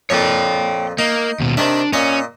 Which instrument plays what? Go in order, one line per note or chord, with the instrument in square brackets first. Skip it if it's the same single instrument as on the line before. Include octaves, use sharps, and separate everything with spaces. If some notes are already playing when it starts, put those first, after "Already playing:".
[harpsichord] F2 A#2 F3 [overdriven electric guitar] C#5 G5
[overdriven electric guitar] A#3 [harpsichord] D#4
[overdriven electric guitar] D#2 B2
[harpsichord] C3 D#3 E5 [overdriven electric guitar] D4
[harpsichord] A#2 D#5 [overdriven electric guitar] C#4